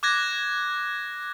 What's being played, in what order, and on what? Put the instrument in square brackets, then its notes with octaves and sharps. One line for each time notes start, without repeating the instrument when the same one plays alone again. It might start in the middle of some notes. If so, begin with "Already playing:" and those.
[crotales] D6 F#6 G#6 A#6